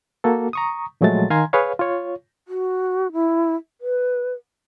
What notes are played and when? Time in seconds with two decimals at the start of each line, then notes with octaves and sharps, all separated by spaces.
0.24 A#3 F#4 A4
0.53 A#5 C#6 D#6
1.01 A#2 F3 F#3 G#3 A3 A6
1.30 D#3 F5 G#5 A#5 C6 G#6
1.53 G#4 B4 C#5 F5
1.79 F4 C#5
2.48 F#4
3.13 E4
3.81 B4